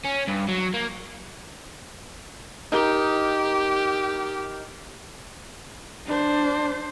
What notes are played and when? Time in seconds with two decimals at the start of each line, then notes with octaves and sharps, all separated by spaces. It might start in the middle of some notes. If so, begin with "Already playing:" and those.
0.04 C#4
0.28 G2
0.48 F#3
0.74 A#3
2.72 D#4 G4 A#4
6.06 D4 C5